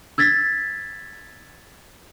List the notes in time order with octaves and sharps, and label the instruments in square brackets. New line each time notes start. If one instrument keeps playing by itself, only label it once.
[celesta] E6 G#6 A6 B6